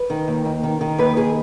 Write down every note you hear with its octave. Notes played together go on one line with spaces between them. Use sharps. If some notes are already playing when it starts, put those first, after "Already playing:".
Already playing: B4
D#3
D#2
D#2
D#3
D#3
D#2 B4
D#2 G#4